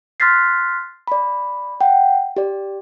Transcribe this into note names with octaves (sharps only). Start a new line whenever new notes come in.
C6 F6 F#6 A6 B6 C7
D5 B5
F#5 G5
G4 D5